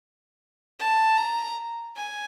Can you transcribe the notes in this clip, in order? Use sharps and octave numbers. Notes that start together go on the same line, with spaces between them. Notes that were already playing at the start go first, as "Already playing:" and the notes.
A5
A#5
G#5